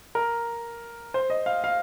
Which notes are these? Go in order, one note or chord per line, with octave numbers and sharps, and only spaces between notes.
A#4
C5
D#5
F5
F5